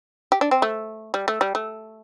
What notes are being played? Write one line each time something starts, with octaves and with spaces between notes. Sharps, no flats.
G4
D4
C4
A3
G3
A3
G3
A3